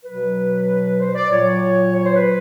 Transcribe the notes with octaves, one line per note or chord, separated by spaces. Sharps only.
B2 F#3 B4
C5
D5
A#2 F#3 C#5
C#5
C5
B4